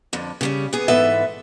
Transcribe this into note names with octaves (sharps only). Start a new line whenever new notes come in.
F2 D3
C#3 G3 C#4
B3 G#4
G#2 E3 B3 A4 B4 E5